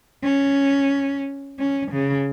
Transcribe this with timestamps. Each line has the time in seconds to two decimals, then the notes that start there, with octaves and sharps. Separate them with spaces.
0.23 C#4
1.59 C#4
1.92 C#3